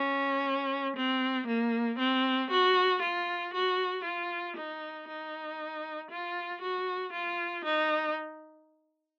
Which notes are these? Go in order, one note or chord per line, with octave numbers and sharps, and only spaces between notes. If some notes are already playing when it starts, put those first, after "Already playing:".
Already playing: C#4
C4
A#3
C4
F#4
F4
F#4
F4
D#4
D#4
F4
F#4
F4
D#4